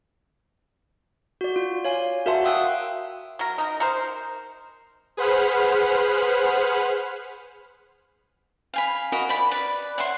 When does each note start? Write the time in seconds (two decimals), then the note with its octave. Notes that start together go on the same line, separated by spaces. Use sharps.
1.41 F#4 D5
1.56 F4
1.85 C#5 D5 F5 G#5
2.26 F#4 A#4 E5 F#5 A5 C6
2.44 E5 F5 G5 D#6 E6 F#6
3.39 F#3 A#4
3.58 D#4 A#4
3.80 D#4 A#4 C5
5.17 G#4 B4 C5 F#5 B5 F6
8.74 F5 G#5 B5
9.12 F#4 A#4 D#5 B5
9.29 D5 B5
9.51 B4 D5
9.98 C#5 E5 F#5 C6